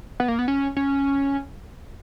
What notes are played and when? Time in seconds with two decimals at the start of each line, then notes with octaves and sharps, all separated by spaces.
0.20 B3
0.28 A#3
0.39 B3
0.48 C#4
0.77 C#4